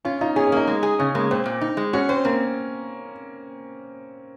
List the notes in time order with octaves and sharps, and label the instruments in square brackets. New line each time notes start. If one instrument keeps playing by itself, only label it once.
[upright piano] C#4 [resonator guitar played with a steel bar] F4
[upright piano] D#4 [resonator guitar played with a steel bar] F4
[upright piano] C#4 [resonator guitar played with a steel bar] G#4
[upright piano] C#4
[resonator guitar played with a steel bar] A#3 [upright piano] D#4
[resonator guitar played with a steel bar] G#3
G#4
[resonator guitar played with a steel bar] C#3 [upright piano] C#4
[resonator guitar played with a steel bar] G#3 [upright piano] A#3
[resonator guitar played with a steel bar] A#2 [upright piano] C4
[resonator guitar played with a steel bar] A#2
D#4
G#3
[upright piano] C#4 [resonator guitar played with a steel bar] F#4
[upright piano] C4 [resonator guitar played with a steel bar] C5
[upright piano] A#3 [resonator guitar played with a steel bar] C4